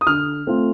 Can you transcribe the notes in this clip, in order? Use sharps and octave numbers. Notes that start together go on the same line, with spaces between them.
D#6
D3 F6
A3 C4 F4